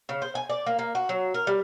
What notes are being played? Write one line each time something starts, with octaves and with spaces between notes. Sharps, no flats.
C#3
C5
G#5
D5
A#3
A#3
F#4
F#3
A#4
G3